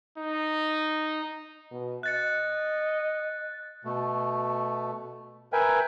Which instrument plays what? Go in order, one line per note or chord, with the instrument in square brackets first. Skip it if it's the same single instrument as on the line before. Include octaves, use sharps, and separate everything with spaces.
[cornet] D#4
[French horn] B2
[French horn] D#5 [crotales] F#6 A6 C#7
[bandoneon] B2 A3
A#4 B4 E5 G5 G#5